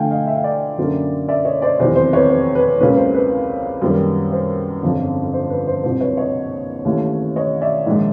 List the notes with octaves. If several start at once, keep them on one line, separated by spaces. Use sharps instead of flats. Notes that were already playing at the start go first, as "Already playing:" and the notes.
Already playing: D2 D3 F3 A3 F5 G5 G#5
D#5 F5
E5
F5
D5 E5
F#2 D3 F#3 A#3 C#4
D5 E5
C#5 D#5
C5 D5
F1 E2 C3 D#3 F#3 C5
C5
B4 C#5
C5
B4
C#2 C#3 F#3 A#3 C#4 B4
C5
B4
F#2 D#3 G3 A#3
C5
G1 F2 C#3
C5
B4
C5
C2 A#2 F#3 C5
B4 C#5
C#5 D#5
D#2 C#3 E3 A3
C#5 D#5
D5 E5
A#1 G#2 D#3 G#3